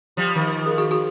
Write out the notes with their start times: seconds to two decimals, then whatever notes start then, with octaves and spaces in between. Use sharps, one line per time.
0.17 F3 G3
0.35 D#3 F3
0.66 G#4 A#4
0.78 F#4 G#4
0.91 F#4 G#4